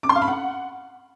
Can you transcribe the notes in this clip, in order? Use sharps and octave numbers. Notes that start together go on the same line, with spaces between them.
D6
C6
F5
B5
F#5